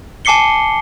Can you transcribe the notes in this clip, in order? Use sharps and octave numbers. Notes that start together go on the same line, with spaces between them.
G#5 A5 D6 C7 C#7 G7